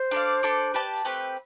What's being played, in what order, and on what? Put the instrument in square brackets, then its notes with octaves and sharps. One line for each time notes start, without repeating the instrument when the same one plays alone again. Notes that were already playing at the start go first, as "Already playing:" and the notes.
Already playing: [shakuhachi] C5
[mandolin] D4 A4 D5 F5
D4 A4 D5
G4 B4 D5 A5
A3 C4 G4 B4